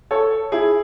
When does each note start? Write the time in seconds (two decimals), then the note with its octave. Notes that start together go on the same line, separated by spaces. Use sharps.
0.11 A4 C#5
0.52 E4 G#4